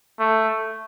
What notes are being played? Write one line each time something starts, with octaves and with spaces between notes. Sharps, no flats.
A3